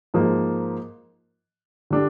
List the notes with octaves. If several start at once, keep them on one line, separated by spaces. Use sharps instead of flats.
G#2 F3 A#3
D3 G3 D4